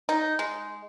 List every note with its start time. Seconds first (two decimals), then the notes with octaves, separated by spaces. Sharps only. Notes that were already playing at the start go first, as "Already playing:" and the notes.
0.09 D#4
0.39 G#3